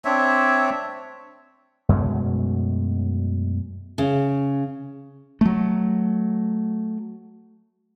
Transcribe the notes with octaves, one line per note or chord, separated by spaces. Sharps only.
C4 D4 C#5 E5
F#2 B2 G#3 A3
C#3
F#3 A3